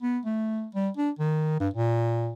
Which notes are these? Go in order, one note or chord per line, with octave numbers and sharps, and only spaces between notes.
B3
A3
G3
D4
D#3
G2
A#2